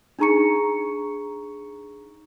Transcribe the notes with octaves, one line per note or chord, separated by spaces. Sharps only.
D4 D#4 G#4 A#5 C#6 C#7